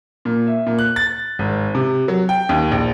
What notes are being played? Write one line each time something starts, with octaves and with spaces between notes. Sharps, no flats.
A#2
E5
A#2
F#6
A6
G#1
C3
F#3
G5
D#2
A#1